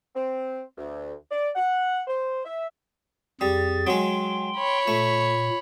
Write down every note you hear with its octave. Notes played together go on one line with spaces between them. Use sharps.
C4
D2
D5
F#5
C5
E5
F2 G3 G#4 A6
F#3 G#3 G5 C6
C#5 B5
A#2 A3